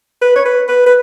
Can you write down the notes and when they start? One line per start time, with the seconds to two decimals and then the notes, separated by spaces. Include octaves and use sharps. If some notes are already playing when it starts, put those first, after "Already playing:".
0.21 B4
0.36 C#5
0.45 B4
0.68 B4
0.86 B4